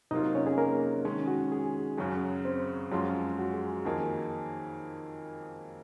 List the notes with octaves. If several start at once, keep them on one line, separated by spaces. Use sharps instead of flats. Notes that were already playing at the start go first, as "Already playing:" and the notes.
C3 F#3 A#3 D#4 F4 D#5
C#4 C#5
G#4
A#3 A#4
D#3 G#3 C#4
F#4
G#4
F#2 C#3 F#3 G#4
C4 C5
F#2 F3 G#3 C#4 F4
F#4
G#4
F2 D#3 A#3 D#4 G#4